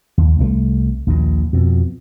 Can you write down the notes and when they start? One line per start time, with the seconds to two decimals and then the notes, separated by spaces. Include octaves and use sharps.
0.18 D#2
0.39 C2 F#3 A3
1.07 A#1 D#2 A#2
1.53 F2 B2